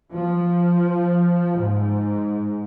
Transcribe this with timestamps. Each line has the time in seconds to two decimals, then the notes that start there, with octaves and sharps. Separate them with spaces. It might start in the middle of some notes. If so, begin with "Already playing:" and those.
0.12 F3
1.57 G#2